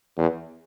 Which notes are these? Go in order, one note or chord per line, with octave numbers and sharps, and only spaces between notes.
E2